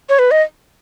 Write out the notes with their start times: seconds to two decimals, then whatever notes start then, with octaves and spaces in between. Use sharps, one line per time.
0.09 C#5
0.19 B4
0.31 D#5